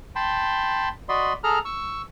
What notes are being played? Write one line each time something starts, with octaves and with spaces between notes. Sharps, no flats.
G5 A5 B5 C6
F#4 D5 D#5 B5 C6
G#4 A4 A#5 F6
C#6 E6